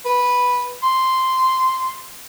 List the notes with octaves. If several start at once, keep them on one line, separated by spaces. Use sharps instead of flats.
B4
C6